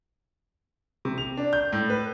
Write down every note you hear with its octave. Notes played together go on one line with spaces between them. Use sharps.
C3
F7
D4
G6
A2
B4